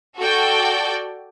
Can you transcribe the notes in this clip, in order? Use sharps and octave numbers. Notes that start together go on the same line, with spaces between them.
F#4 A4 D5 G5